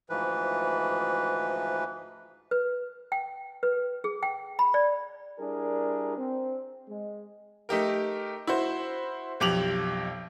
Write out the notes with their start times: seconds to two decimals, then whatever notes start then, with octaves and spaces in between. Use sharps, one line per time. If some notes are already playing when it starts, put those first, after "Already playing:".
0.10 D2 G#2 E3 F3 B4
2.51 B4
3.12 G5
3.63 B4
4.04 G#4
4.23 G5
4.59 B5
4.74 D5
5.38 G3 D4 E4 G#4 A#4
6.16 C4
6.88 G#3
7.69 A3 D#4 G4 A#4
8.47 E4 F#4 C5
9.40 B1 F2 G4 D6 F7 F#7